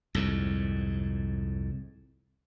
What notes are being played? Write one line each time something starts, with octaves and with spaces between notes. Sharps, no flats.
C2 F2 G#2